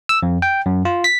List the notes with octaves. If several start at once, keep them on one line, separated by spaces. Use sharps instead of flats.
E6
F2
G5
F#2
F4
B6